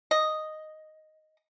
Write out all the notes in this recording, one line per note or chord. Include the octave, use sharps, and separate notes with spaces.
D#5